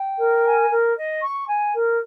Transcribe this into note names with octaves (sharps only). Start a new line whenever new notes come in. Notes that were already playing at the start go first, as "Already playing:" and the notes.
Already playing: G5
A#4
G#5
A#4
D#5
C#6
G#5
A#4